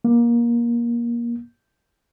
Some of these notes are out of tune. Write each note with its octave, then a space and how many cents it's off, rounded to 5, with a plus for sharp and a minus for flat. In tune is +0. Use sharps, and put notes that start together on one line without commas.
A#3 +20